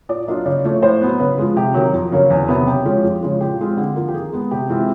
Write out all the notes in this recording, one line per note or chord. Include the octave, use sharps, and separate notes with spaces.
A#2 D5
F#3 A#3 D4 F4 D#5
C#3 D5
F3 A3 C#5
A2 C5
F#3 B3
C#3 B4
F3 G#3
C3 G4
D#3 F#3
F2
C#3 F#3 A#3 C#4
E2
C3 D#3 F#3 B3
C#3 G4
F3 G#3 C#4
F2
C#3 F3 G#3
A#2 G4
F3 G#3 C4 F4
D3
F3 A#3
G4
D#3 G#4
G#3 B3
C3 G4
E3 G#3 C4 F4